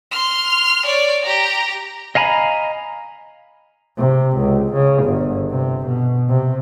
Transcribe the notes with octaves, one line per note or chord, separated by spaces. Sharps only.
C6 F6
C#5 D5
G4 A#5
D#5 F5 G#5 A#5 B5
C3
C#2
C#3
G1
C3
B2
C3